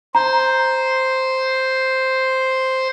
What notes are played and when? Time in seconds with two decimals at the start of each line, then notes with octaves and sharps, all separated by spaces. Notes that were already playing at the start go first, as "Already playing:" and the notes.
0.15 C5 A#5